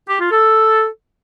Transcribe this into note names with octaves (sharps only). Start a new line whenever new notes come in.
G4
F4
A4